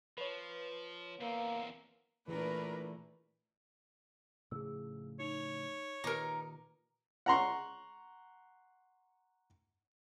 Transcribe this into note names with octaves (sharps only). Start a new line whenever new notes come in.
F3 B4 C#5
E2 A#3 C4
A#2 E3 A3 D4 G#4 A#4 B4 C#5
A2 C#3 F3 G#4 E6
D#4 C#5 C#7 F7
A#2 D#3 D#4 G4 A#4 B4 D6
F#5 A#5 C6 C#6